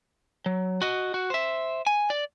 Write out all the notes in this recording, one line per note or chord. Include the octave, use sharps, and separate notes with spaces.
F#3
F#4 D#5
F#4
C5 E5
G#5
D5